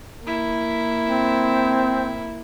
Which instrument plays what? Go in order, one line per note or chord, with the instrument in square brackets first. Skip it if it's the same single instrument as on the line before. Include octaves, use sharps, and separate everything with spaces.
[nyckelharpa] A#3 E4
[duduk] C4